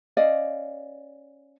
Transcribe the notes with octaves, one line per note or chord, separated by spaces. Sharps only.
C#4 D5 D#5 F5